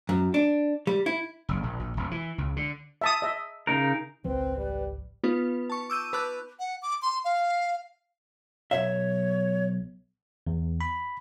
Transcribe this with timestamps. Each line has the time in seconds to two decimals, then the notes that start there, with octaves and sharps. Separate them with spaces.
0.09 F#2
0.34 D4
0.87 G3
1.06 E4
1.49 F#1
1.63 A#1
1.79 A#1
1.97 E1
2.11 E3
2.38 C#2
2.56 D3
3.01 E5 A5 D#6
3.22 D#5 E5
3.67 C#3 D#4 A#4
4.25 G#1 C#2 F3 C4 B4
4.57 G3
5.24 B3 D#4 F4 B4
5.70 A5 C#6
5.90 D6 E6 G6 D#7
6.13 B4 A5 B5 D6 F#6
6.59 F#5
6.82 D6
7.02 C6
7.25 F5
8.71 B1 F2 C#5 E5
10.47 E2
10.81 B5